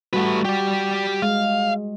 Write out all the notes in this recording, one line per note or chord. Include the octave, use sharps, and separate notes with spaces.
G3 A3 F#4 B4
G4 D5
G#3 F5